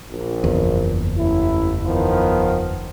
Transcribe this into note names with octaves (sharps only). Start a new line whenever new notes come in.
A#1
F#1 E2
A1 E4
D#3 F3 B3